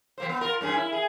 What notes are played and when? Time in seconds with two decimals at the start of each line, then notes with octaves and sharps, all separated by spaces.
0.18 F3 A#3 C5
0.29 B3
0.41 F4 A#4
0.61 G2 C#4 G#4
0.76 E4
0.92 G#4